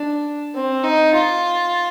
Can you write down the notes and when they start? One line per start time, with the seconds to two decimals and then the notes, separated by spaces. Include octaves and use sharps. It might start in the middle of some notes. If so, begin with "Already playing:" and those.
Already playing: D4
0.55 C4
0.84 D#4
1.14 F4